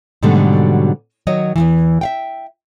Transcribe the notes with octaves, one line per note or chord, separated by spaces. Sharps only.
G#2 B2 D3 F#3 G3 A3
D#3 F#3 C#5 D#5
E2 G2 E3
E5 F5 G5